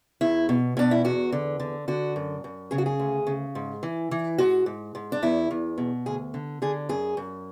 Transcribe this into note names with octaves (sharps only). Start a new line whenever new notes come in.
E2 E4
B2
B2 D4
E4
E2 F#4
D3
D3
D3 F#4
F#2
F#2
C#3 G#4
F#4
G#4
D2
C#3
G#2
E3
E3
G#2 F#4
G#2
G#2
D4
E2 E4
E2
B2
D2 G#4
D3
D3 G#4
F#2 G#4
F#2